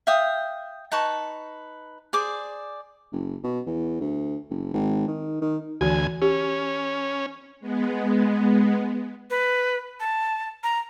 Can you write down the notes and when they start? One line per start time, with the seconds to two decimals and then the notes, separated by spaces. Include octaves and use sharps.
0.07 E5 F5 G5 D#6
0.92 D#4 B4 A5 C#6
2.13 G#4 C5 D5 D6
3.12 F#1
3.44 B2
3.66 E2
4.00 D2
4.50 F#1
4.73 G#1
5.08 D#3
5.41 D#3
5.81 D2 E3 F#4 G#5
6.22 C#4 G4
7.60 G#3 B3
9.30 B4
10.00 A5
10.63 A#5